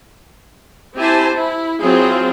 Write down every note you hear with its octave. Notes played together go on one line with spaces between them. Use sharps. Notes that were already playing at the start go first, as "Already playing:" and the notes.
C4 E4 G4 C5 G#5 A5
E4
F#3 C4 E4 F4 G#4